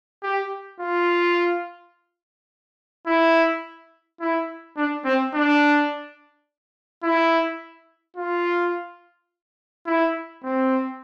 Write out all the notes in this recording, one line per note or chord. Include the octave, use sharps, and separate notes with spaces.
G4
F4
E4
E4
D4
C4
D4
E4
F4
E4
C4